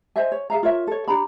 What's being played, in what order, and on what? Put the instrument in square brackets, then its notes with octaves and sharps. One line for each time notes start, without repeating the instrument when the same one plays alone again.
[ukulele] C5 D#5 E5 G#5
C#5
G#4 E5 F5 A#5
F4 A#4 C#5 E5
A4 C#5
D4 G4 A#5 B5